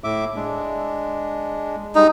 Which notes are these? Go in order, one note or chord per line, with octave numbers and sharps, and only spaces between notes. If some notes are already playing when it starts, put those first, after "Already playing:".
A2 E5 D6
G#3 D4
G3 G#3 D#4